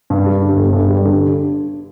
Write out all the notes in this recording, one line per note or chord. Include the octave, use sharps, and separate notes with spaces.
G2
G3
D3
G1
G2
G3
D3